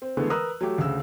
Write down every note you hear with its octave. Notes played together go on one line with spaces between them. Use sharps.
C4
D3 E3 G#3 A3 B3
A#4 B4 D#6 E6 F#6
F#3 A3 G4
D2 C#3 E6